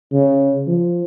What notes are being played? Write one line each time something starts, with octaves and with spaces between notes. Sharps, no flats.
C#3
F3